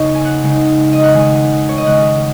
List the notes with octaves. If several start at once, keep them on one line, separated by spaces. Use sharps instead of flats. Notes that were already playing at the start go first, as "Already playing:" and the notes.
Already playing: C#3 A#3 D#4 C#5 D#5
G#5
F#5
C#3 G#3 D#4
D#5
F#5
D#3 G#3 D#4 G#5
C#5
D#5
C#3 G#3 C#4 F#5